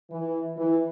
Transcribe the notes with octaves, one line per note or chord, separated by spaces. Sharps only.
E3
E3